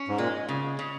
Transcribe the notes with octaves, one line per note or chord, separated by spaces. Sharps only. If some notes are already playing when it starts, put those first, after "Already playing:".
Already playing: C#4
G#2
A#2 G#3
C#3
C#3